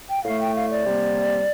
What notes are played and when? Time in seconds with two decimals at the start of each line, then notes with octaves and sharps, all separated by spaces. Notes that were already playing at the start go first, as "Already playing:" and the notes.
0.09 G5
0.25 A2 A3 F5
0.40 G5
0.55 F5
0.70 D5
0.86 C3 G3 A#3